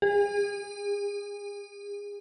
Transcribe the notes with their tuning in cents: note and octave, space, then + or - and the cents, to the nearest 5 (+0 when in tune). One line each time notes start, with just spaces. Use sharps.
G#4 -35